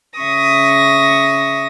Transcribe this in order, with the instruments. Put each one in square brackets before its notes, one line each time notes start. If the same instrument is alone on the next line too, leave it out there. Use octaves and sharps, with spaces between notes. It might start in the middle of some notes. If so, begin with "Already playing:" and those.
[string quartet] C#3 E5 C#6 D#6 A#6